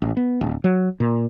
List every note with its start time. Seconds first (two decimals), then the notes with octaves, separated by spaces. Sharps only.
0.02 A1
0.17 B3
0.41 D1
0.64 F#3
1.00 A#2